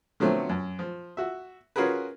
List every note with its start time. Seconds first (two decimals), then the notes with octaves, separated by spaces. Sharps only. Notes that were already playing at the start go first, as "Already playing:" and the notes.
0.20 D3 F3 F#3 A3 B3 C4
0.49 F#2
0.79 F3
1.17 F#4 E5
1.76 C#4 F4 F#4 G#4 A#4 B4